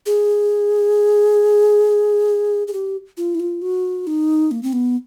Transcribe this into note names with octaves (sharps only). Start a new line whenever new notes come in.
G#4
G#4
G4
F4
E4
F4
F#4
D#4
A#3
C4
B3